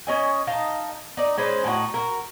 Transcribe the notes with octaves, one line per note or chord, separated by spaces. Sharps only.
C#4 D#5 G#5
D#4 D#5 F5 A5
D#4 D5
G#3 C#4 B4 C5
A2 D#4 E4 F#4
F#4 G4 A#4